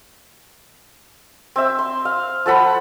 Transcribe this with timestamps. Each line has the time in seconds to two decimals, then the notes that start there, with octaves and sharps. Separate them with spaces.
1.56 C4 E5
1.79 C6
2.05 F5
2.46 F3 A4 F#5 B5